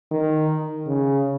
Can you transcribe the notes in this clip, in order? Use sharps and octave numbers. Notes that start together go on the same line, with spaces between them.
D#3
C#3